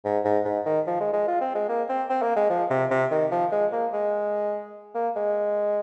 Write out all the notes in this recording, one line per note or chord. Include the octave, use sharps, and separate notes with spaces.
G#2
G#2
G#2
D#3
F3
G#3
G#3
F4
C4
G#3
A#3
C4
C4
A#3
G#3
F3
C3
C3
D#3
F3
G#3
A#3
G#3
A#3
G#3